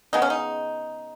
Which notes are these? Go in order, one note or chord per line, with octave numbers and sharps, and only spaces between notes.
C#3 G#3 B3 D#4
C#4
D#4